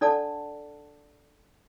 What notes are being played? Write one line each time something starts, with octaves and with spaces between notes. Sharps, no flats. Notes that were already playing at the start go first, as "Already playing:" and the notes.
D4 A4 D5 F#5 A5